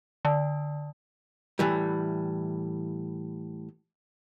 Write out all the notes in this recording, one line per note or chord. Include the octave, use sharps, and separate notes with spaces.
D3
A2 E3 G3